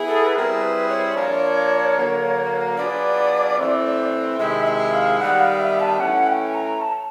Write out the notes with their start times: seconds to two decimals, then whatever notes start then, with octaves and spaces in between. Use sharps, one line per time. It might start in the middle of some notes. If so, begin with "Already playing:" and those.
Already playing: B3 E4 G#4
0.08 A4
0.26 B4
0.35 G3 C4 E4 G#4 A#4
0.62 B4
0.89 C#5
1.15 F3 A#3 D4 F4 A#4
1.97 D3 F#3 A#3
2.77 F#3 B3 D4 F4 G#4 D5
3.59 E3 A3 C4
4.39 C3 D#3 G#3 C4 E4 E5
4.66 E5
4.92 F5
5.19 D#3 G3 B3 F#5
5.40 F5
5.60 E5
5.80 A5
6.00 E3 A3 C#4 F#5
6.27 G5
6.54 A#5
6.81 A5